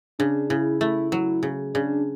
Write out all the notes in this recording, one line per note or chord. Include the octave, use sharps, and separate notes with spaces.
C#3 D4
C#3 E4
A3 E4
F#3 E4
C#3
C#3 D4